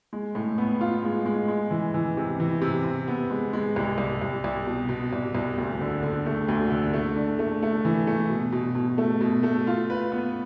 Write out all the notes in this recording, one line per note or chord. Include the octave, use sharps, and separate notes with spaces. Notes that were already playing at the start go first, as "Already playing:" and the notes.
G#3
A2
B3
F4
G#3
G#3
G#3
E3
E3
C3
E3
C3
C3
B3
G#3
G#3
C2
C2
C2
C2
B2
B2
C2
C2
D2
D3
D3
A3
D2
D3
A3
D4
A3
A3
E3
A3
B2
B2
B2
A3
B2
A3
F4
B4
B3